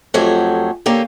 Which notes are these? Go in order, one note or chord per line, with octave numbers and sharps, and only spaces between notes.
F2 F#3 A3 G4 G#4
D3 A#3 C#4 G4 A4